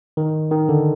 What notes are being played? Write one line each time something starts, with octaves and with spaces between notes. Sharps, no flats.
D#3
D#3
D3